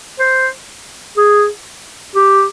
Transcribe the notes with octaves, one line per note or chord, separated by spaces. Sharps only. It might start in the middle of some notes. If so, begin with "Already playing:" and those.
C5
G#4
G4